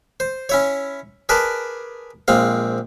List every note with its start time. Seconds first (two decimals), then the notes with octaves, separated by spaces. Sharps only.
0.20 C5
0.49 C#4 E4 C#5
1.29 G#4 A#4 B4 D5 A5
2.28 A#1 G#3 C4 F5